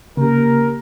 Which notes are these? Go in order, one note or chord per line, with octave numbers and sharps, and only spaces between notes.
C#3 A#3 G4 A#4